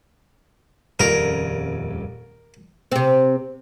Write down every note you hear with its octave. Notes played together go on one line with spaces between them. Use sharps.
D#1 F2 C#3 A#4
C3 C4